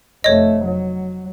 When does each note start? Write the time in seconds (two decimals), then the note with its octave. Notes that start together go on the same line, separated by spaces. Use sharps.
0.24 F1 A3 C#5 D#5
0.65 F#3